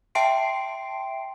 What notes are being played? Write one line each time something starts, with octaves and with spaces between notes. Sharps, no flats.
E5 G5 A5 C6 C7 D7